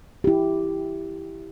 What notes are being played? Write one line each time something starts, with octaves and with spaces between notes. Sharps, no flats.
E4 G4